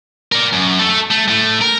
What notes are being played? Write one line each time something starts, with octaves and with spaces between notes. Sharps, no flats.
A#4 D5
F#2
A3 A4
A3
A2 A3
A#4